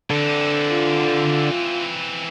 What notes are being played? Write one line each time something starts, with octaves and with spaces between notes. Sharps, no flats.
E3 C4 D4 A4
F4